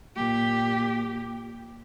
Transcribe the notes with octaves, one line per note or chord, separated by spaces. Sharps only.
A#2 G4